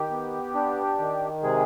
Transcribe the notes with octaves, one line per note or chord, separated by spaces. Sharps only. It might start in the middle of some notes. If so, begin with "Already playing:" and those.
Already playing: D#3 G4
B3
D4
D#3
C3 G#3 G#4